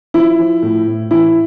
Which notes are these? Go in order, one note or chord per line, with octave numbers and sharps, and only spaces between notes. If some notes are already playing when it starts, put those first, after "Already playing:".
F3 E4
F3
A2
A2
E3 E4